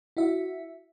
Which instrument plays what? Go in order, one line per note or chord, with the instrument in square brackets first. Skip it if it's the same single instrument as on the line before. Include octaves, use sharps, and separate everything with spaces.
[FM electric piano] E4 F#4 E5